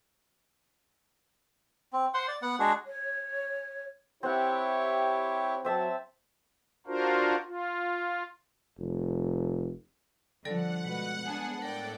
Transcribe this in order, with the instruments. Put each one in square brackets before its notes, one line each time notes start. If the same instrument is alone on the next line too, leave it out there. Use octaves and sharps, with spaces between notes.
[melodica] C4
C5 F#5 C6
D5
B3 F#5
G#3 D4 F#4 G#4
[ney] C#5
[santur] C4 F#5 [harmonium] E4 G4 C#5
[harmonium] F#3 [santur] C4 E5 A5
[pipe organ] D4 F4 F#4 A#4 C5
F4
[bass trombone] F1
[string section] D3 F3 [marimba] G3 A4 D5 [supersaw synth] F#5
[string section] B2 B4 [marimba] G#3
[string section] B3 D4 G#4
[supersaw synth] A2 [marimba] A#4 [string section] D5 G5